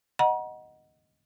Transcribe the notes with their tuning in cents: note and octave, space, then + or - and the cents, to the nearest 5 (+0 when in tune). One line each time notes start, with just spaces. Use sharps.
D#5 +0 F#5 +0 A#5 +40